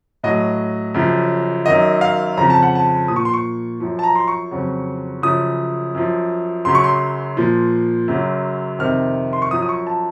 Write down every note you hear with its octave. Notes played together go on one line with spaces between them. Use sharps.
A2 F#3 D#5
F#2 C#3 F3
F#2 D#3 F#3 D#5
F5
F2 C#3 F3 A#5
A5
F#5
A5
A#2 F3 D#6
C#6
C6
C#6
F#2 F3
A5
A#5
C6
C#6
F2 C#3 F#3
F#2 C#3 F3 D#6
F#2 F3
F#2 C#3 F#3 C6
C#6
C6
A#2 F3
F#2 C#3 F#3
F2 C3 D#3 F6
C6
C#6
F#2 F3 D#6
D#6
C#6
A5